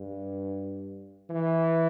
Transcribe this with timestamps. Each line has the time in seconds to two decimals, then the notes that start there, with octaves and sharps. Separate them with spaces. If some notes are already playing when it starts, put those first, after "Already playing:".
Already playing: G2
1.30 E3